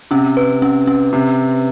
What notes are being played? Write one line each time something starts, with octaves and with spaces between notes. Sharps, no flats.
C3 C#4
B4
C#4
C#4
C3